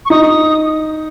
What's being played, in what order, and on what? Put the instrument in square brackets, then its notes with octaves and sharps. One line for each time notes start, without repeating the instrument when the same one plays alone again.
[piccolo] C#6
[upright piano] D#4 [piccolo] D#6